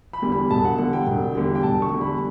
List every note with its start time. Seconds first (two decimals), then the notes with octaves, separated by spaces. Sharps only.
0.13 B5
0.22 E2 D3 G3
0.32 B5
0.50 E1 A5
0.64 F#5
0.78 E2 D3 G3 F#5
0.93 G5
1.07 E1
1.35 E2 D3 G3
1.55 G5
1.63 E1 A5
1.82 C#6
1.91 E2 D3 G3
2.01 B5